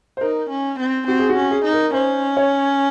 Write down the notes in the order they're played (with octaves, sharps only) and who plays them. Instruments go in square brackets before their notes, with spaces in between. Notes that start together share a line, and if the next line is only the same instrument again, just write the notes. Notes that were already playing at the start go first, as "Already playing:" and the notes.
[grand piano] C5
[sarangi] D#4 [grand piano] A#4
[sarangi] C#4
C4
[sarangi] C4 [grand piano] F#4
[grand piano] G#4
F#4
[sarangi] C#4
[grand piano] G#4
[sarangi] D#4
[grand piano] A#4
[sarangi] C#4 [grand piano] C5
[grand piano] C#5